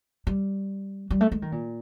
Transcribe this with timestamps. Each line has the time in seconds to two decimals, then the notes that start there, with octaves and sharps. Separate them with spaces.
0.27 G3
1.10 G3
1.21 A3
1.32 G#3
1.42 D#3
1.52 A#2